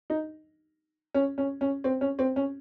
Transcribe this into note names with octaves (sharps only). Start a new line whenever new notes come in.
D#4
C#4
C#4
C#4
C4
C#4
C4
C#4